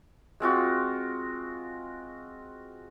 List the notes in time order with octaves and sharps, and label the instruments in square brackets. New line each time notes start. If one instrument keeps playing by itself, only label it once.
[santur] G#3 C4 F4 F#4